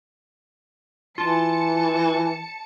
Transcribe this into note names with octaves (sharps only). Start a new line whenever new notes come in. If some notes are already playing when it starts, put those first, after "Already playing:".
E3 F4 A5 C#7